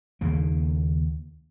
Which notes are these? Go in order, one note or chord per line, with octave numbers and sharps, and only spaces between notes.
D#2 C#3 A#3